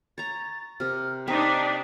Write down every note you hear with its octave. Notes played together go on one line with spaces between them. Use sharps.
C#5 A#5 A6
C3 A#4 F6
C4 D4 D#4 B6